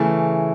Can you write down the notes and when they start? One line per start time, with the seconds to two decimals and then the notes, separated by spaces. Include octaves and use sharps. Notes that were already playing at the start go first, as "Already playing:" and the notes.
Already playing: C#3 E3 A3